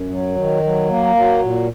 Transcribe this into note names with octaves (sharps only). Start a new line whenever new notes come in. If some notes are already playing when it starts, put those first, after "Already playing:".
Already playing: F#2
F#3
D#3
F#3
A#3
F#3
A#2